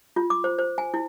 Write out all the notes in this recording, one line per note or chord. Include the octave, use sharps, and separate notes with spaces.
F4
D6
C5
C5
G#5
E4